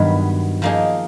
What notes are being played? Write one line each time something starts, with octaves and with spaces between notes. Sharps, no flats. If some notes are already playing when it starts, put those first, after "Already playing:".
Already playing: G2 D#3 F#3 B3
F3 A#3 D#4 G#4